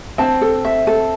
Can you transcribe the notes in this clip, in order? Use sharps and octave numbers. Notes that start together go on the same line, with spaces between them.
C4 A5
A4
E5
A4